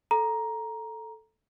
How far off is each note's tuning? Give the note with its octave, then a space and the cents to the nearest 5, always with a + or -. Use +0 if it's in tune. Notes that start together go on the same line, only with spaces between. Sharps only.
A4 +0 A#5 +10